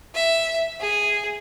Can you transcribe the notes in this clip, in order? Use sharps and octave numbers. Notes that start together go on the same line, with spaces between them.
E5
G#4